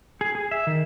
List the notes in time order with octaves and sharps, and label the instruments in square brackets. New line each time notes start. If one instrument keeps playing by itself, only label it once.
[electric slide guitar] G#4
G#4
E5
D#3